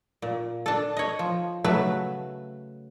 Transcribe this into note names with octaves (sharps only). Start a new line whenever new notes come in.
A#2
D4 A4
C#5 D#5
F3
C#3 F#3 A3 B4 E5